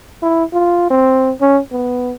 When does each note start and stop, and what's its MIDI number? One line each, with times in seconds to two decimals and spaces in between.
0.23 0.44 64
0.53 0.86 65
0.90 1.32 60
1.41 1.60 61
1.72 2.13 59